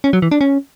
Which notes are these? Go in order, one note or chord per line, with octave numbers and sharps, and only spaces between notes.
C#4
F#3
E3
D4
C#4